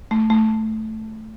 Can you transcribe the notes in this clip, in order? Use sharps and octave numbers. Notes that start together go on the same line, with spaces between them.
A3
A3